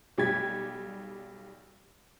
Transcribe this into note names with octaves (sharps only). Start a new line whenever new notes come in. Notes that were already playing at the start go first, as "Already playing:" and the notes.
B1 G3 G4 G#6 B6